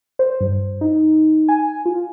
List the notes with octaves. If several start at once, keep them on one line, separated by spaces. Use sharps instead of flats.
C5
G2
D#4
G#5
F4